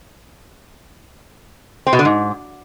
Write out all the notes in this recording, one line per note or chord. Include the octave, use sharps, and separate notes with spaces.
C4
B2
D3
G#2